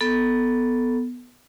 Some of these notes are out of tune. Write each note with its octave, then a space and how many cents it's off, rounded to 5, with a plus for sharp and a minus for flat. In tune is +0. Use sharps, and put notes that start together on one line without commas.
B3 +0 A4 +0